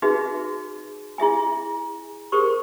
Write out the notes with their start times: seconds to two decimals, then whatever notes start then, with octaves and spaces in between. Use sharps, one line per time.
0.02 D#4 F#4 G#4 B4 E5
1.18 E4 G#4 E5 G#5
2.32 G4 G#4 A#4 C5 C#6